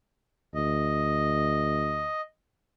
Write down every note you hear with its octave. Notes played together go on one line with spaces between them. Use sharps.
D2 D#5